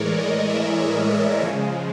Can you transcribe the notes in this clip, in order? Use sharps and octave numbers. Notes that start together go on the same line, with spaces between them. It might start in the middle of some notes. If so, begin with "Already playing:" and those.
Already playing: A2 E3 G#3 A#4 C#5 D5
D#5
E5
E5
D5
C#3 F3 G#3 C#5